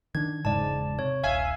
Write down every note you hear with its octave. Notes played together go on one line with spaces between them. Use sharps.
D#3 D4 G#6
E1 G#2 C#3 G#3 D5 A5
C3 C#5
D#1 A#1 E5 F5 G#5